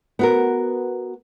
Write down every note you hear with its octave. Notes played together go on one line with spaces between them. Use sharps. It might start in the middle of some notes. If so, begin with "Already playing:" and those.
B3 F#4 A#4